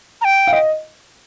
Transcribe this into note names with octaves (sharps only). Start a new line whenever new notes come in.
A#5
G5
F5
D#5 G5